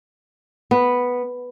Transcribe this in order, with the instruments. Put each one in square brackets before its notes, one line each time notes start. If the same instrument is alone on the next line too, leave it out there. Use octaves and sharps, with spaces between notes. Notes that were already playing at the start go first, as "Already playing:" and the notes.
[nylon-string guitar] B3